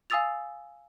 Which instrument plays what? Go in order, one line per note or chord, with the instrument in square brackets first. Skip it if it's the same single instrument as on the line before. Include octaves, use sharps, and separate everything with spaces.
[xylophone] F5 G#5 D#6 E6 A6 F7